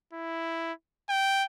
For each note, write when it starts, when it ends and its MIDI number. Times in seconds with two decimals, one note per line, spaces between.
0.13 0.73 64
1.09 1.44 79